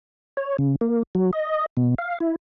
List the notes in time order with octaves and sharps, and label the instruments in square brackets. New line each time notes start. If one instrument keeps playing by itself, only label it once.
[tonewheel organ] C#5
C#3
A#3
F#3
D#5
B2
F5
E4